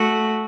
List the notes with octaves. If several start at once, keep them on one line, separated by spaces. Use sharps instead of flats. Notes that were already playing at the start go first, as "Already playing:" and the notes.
Already playing: A3 F#4